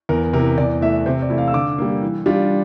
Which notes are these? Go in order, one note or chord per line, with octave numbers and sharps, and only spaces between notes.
E2 A#4
C3 A#4
E3
E2 D5
E3 A3 E5
C3 C5
D5
E3 A3 E4
F5
E6
D3 D6
G3 A#3
E3
G3 D4 F4